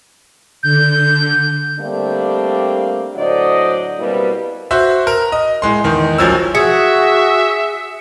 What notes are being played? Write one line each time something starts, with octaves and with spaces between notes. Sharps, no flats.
D3 G6
G3 A3 A#3 C4 D4 G4
A2 D3 F#3 C5 D5 D#5
B2 G3 A#3 C4 E4 B4
F#4 C5 E5
A#4
D#5
A2 G#3 C6
E2 D#3
D1 G#1 F3 F#3 C#4 E6
F#4 G#4 E5 C#7